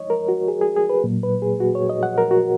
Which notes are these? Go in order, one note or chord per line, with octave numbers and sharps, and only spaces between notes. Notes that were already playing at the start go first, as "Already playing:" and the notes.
Already playing: C#5 D#5
A#4
F#4
G#4
G#4
G#4
B4
A#2 F#3 A#3
B4
G#4
F#4
C#5
D#5
F#5
A#4
F#4